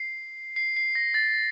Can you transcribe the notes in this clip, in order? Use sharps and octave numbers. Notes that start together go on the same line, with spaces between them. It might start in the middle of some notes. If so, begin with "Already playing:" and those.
Already playing: C7
C7
C7
A#6
A6